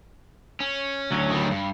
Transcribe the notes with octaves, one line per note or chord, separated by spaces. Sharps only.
C#4
D2 F#3
D#3 G3
G2